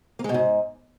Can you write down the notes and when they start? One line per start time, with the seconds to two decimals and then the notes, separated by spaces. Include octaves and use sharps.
0.19 A#3
0.24 G#3
0.29 B2
0.34 G#2